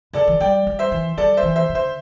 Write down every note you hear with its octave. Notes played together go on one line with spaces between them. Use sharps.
D3 A4 D5
E3
G3 D5 G5
G3
C5 E5
E3
G3 A4 D5
C5 E5
E3
C5 E5
D3
C5 E5